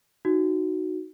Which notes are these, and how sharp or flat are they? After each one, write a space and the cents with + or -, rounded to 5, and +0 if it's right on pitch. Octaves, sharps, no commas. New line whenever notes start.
D#4 +0 F#4 +0